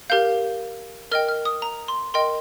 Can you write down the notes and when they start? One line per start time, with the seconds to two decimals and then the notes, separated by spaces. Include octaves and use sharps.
0.10 G4 A#4 F5 G6
1.11 A#4 D#5 G5 F6
1.29 F6
1.45 D#6
1.62 A#5
1.88 C6
2.14 A#4 D#5 G5 C6